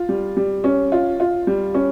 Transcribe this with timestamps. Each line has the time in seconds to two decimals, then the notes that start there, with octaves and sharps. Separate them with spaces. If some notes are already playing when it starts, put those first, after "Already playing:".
Already playing: F4
0.09 G3
0.37 G3
0.64 C#4
0.92 F4
1.20 F4
1.47 G3
1.74 C#4